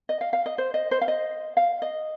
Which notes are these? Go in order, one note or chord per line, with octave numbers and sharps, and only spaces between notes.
D#5
F5
F5
D#5
C5
D#5
C5
F5
D#5
F5
D#5